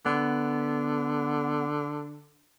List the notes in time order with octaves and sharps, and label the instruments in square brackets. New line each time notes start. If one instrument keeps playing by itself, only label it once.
[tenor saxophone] D3 [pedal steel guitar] B3